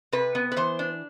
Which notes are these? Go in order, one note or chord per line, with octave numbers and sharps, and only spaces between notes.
C3 B4
B3
B4
E3 C5
D4